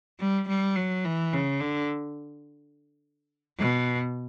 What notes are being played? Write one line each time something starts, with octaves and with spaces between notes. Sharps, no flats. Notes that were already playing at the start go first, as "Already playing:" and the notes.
G3
G3
F#3
E3
C#3
D3
B2